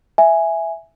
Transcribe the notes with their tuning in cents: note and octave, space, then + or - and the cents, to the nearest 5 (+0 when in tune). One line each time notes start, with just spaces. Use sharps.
E5 +0 G#5 +0